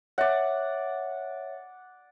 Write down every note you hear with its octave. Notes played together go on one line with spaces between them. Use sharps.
C#5 D5 E5 F#5